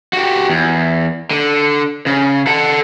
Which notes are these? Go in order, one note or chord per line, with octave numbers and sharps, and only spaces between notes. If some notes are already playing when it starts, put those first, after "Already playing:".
F#4 G4
E2
D3
C#3
A4 F#5